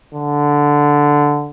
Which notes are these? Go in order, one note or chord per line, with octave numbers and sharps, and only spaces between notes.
D3